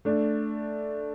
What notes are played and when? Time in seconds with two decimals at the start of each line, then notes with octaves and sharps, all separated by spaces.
0.05 A3 D4